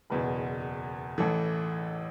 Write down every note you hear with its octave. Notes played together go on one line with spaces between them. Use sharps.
F#1 E2 B2 B4
A1 A2 E3 A4